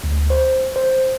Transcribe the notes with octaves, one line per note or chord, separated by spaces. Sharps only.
D2
C5
C5